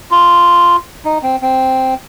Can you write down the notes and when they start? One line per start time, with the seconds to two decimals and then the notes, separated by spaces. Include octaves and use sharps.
0.11 F4
1.05 D#4
1.23 C4
1.42 C4